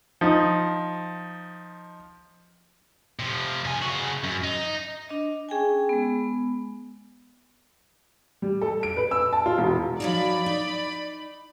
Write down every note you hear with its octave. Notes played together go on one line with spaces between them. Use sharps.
F3 D#4
C3 F3
G2 G#5
C#3 F#4
F#2
D#4
D4 D#5
C#4 G#4 G5 G#5
G#3 B3
G3
A4
D7
B4
E6
A5
F4
E1
F3 F#3 D#4 D5 B5
D#4